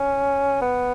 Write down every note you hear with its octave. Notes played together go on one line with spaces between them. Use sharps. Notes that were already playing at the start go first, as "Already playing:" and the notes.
Already playing: C#4
B3